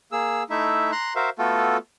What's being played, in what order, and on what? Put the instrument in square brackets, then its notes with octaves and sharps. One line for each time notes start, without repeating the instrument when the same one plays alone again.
[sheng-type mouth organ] A#3 G#4 E6
A3 D#4 E4 E5
A#5 C6 F#6
F#4 A#4 C5 E5 F5
A3 B3 F4 F#4 A4